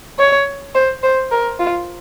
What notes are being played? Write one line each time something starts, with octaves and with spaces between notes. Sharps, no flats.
C#5
C5
C5
A#4
F4